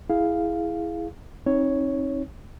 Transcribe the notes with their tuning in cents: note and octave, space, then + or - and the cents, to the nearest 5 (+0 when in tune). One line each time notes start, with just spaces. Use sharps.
E4 +0 G#4 +0 F5 +0
C4 +45 D#4 +15 C#5 +0